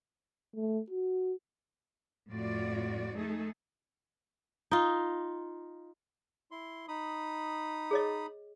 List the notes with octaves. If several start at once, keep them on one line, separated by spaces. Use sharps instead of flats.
A3
F#4
F2 A2 F4 F#4 D5
A3 D#4 G#4 A4
D#4 F4
E4 C6
D#4 B5 D#6
G#4 C#5 D#5